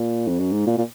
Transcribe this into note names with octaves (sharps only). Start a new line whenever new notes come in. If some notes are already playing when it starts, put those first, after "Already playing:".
Already playing: A#2
F2
F#2
G#2
A#2
A#2